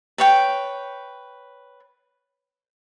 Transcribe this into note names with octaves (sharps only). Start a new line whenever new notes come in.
B4 C#5 G5